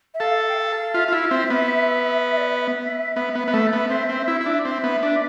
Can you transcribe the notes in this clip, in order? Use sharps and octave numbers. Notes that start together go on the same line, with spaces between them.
E5
A4 F5
G5
F5
F4 E5
F4
E4
C4
B3
D5
E5
B3
B3
B3
A3
B3
C4
C4
E4
E4
D4
C4 E5
B3
D4